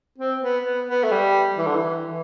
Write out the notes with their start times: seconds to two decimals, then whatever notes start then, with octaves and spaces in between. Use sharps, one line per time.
0.18 C4
0.42 B3
0.64 B3
0.87 B3
1.04 A3
1.11 G3
1.58 E3
1.67 D3
1.75 E3
2.04 E3